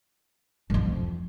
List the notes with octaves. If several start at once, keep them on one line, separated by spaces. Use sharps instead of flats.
F#2
F2